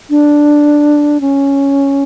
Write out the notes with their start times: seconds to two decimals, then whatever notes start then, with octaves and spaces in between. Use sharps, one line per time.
0.10 D4
1.21 C#4